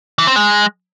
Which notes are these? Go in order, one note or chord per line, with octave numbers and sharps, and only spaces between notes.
E3
C4
G#3